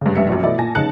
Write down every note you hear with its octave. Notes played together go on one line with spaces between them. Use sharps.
G2 C#3
F1 G2 E5 C#7
A#1 F#2
B2 E3 A3 E4 D5 D#5
A#2 G#5 A5 A#6
F1 C#3 D#4 A5 F#6 C#7